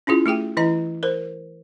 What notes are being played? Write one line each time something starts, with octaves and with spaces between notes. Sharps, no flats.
C#4 E4 F4 G#4
A3 G4 G#4 G5
E3 E4 D#5 A#5
A#4 C5